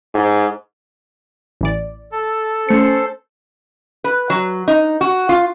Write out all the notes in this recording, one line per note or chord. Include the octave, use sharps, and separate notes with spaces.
G#2
A1 E3 D5
A4
A3 C#4 C5 C#7
B4
F#3
D#4
F#4
F4